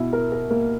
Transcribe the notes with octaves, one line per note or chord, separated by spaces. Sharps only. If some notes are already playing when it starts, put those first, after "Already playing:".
Already playing: B2 E4
A#4
A#4
A#3